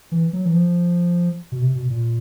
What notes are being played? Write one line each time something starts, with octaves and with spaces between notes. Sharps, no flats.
E3
F#3
E3
F3
B2
C3
B2
A#2